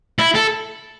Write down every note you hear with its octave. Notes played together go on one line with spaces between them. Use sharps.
E4
A4